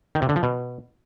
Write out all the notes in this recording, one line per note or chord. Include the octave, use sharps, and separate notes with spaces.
D#3
C3
D3
F3
B2